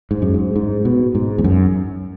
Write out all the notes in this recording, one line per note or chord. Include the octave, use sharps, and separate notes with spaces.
G#2
F#2
G#2
G#2
B2
G#2
E2
F#2